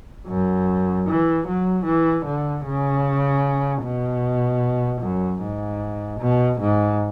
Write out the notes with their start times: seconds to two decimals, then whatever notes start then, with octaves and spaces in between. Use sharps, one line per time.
0.27 F#2
1.07 E3
1.47 F#3
1.85 E3
2.25 D3
2.65 C#3
3.83 B2
5.02 F#2
5.41 G#2
6.20 B2
6.60 G#2